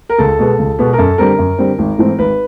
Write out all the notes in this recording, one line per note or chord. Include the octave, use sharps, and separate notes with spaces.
A#4
C#2 A4
B2 G#3 B3
C#2
B2 G#3 B3
A#4
F#2 A4
D3 G3 C4 A#4
F#2
D3 G3 C4
G#1
G#2 E3 A3 C4
G#1 B4